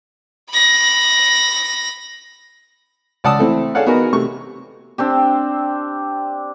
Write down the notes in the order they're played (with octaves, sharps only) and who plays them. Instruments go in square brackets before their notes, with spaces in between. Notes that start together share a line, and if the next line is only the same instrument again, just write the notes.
[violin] B5 A#6
[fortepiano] C#2 D5 F#5 A5 D#6 E6
A3 C4 E4 A4
G#4 A4 C#5 D5 F5 F#5
B3 D#4 F#4 G#4 A#4
C3 A3 C#6
[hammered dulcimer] C4 D4 G4